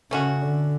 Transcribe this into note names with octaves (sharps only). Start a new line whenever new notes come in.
C#3 A3 C#4 F#4
D3